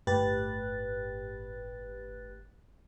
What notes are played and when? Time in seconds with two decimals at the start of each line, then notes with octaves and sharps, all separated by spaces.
0.07 G1 A2 G4 B4 F#6 A6